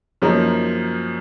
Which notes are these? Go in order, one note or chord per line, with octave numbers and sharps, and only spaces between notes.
F#2 F3 A#3 D#4